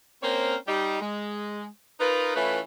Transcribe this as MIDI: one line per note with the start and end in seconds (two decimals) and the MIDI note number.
0.22 0.55 58
0.22 0.55 60
0.22 0.55 61
0.22 0.55 70
0.22 0.55 72
0.22 0.55 73
0.67 1.00 55
0.67 1.00 63
0.67 1.00 67
1.00 1.66 56
1.99 2.31 63
1.99 2.31 65
1.99 2.31 70
1.99 2.31 71
2.35 2.59 52
2.35 2.59 57
2.35 2.59 61
2.35 2.59 64
2.35 2.59 65
2.35 2.59 71